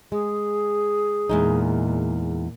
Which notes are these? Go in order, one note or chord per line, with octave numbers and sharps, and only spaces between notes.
G#3 G#4
E2 A#2 G#3 D#4